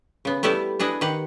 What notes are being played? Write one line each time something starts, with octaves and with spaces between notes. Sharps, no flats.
C#3 B3
G3 A3 B3 E4 G4 A4
D4 E4 G#4 B4 D#5
D#3 G4 B4 F#5